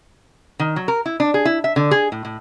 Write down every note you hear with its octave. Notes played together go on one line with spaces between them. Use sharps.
D#3
F#3
A#4
E4
D4
G#4
E4
E5
D3
G#4
A2
A2